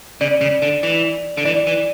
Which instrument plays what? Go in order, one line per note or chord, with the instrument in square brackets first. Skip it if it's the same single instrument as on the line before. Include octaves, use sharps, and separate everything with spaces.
[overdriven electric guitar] C#3 [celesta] D5
[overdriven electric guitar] C#3
D3
E3
D3
[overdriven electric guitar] E3 [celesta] D5
[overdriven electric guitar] E3